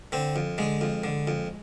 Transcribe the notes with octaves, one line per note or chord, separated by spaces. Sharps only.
D3 C4
F2
D3 G#3
F2
D3
F2